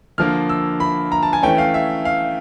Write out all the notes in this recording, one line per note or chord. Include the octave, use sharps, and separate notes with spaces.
D3 F3 A#3 F6
E6
B5
A#5
A5
G#5
E3 A3 C#4 G5
F5
E5
F5